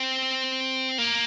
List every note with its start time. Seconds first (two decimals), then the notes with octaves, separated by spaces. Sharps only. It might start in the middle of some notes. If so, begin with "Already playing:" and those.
Already playing: C4
0.98 A#3